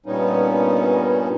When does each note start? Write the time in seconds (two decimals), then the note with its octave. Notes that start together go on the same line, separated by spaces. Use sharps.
0.06 G2 A#2 G3 B3 C#4 D#4